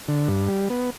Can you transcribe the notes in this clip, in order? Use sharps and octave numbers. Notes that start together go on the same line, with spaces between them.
D3
G2
G3
B3